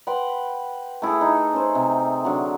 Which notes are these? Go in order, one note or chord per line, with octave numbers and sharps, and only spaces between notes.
B4 F#5 G5 C6
A3 E4 G#4 A4
D#4
C#4 C5
C3
D3 F#3